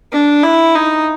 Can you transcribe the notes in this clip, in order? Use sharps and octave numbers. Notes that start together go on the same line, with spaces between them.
D4
E4
D#4